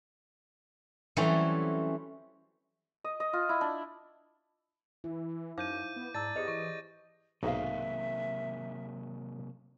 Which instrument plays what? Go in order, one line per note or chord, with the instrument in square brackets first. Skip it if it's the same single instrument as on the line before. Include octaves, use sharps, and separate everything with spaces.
[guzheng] E3 F#3 G3 A3 C4 C#4
[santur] D#5
D#5
F4
E4
D4
[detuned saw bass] E3 [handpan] E4
[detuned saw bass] F#2 [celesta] D#4 C5 F5 [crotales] D6 G6 D#7
[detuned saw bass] B3
[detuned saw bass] G#2 [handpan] D5 [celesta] A5 A#5 E6 [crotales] A6
[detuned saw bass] B3 [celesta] G4 G#4 C5 [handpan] D#5
[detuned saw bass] E3 [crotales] C#6
[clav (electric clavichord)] B1 G#2 [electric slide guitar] C3 F#3 A#3 [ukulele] D#4 F5 [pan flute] E5